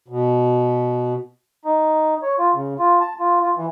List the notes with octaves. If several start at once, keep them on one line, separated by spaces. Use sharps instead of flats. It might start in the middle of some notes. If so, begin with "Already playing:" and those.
B2
D#4
C#5
F4
C#3
F4
A5
F4
F4
E3